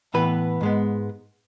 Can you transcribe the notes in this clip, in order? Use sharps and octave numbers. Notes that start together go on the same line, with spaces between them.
A2 E3 B3 B4
G#2 G#3 B3